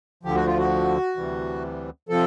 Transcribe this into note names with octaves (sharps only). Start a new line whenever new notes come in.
D2 D3 F3 G4
F#4
F4
F#4
D2 C3 E3 G3
C3 F3 A4